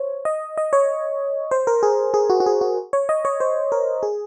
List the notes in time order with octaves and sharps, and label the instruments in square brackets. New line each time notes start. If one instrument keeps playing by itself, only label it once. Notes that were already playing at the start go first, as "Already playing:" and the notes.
Already playing: [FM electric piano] C5 C#5
D#5
D#5
C#5
C5
A#4
G#4
G#4
F#4
F#4
G#4
F#4
C#5
D#5
C#5
C5
A#4
G#4